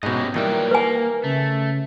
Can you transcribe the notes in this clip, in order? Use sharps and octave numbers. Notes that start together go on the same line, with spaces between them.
G#2 B2 C#4 G4 D#5
A#2 D#3 E3 F#3 G3 A#4 G5
A#3 B4 G#5
C#3 A3